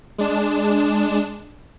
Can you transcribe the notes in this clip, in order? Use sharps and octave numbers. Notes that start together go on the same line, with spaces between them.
G#3 D4 E7